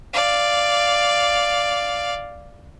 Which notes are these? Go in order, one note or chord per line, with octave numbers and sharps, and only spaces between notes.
D5 F5